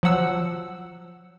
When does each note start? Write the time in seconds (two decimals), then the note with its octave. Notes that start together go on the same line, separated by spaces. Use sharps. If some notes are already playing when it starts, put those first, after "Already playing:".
0.03 F3 F#3 F#5 E6